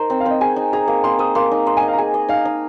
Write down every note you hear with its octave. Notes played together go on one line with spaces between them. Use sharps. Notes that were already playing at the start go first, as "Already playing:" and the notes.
Already playing: D#4 A#4 C5
C4
F5
C4 D#5
G#4 G#5
D#4
G#4 A#5
A#3
A#3 C6
C5 D#6
A#3 C6
D#4
D#5 C6
G#5
D#4
F5
A#5
G#4 G#5
D#5
D#4 F5
D#4